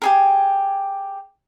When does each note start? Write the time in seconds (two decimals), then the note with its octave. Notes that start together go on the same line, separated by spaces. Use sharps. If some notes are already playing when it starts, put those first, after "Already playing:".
0.02 G4 G#4 A#4